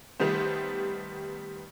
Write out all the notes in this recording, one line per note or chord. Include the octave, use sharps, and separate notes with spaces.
D#3 G3 A3 B3 C5